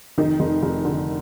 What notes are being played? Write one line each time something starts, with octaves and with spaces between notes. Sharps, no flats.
F1 D#3 D#4
F1
F1
D3